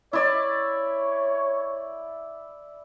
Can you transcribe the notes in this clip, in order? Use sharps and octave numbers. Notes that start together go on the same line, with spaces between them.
E4 C#5 D5